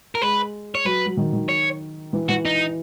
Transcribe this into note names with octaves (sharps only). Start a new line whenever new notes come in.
A#4
G#3 B4
C#5
F#3 B4
F#3
D#3
D#3
C#5
E3
E3 F#4
D#4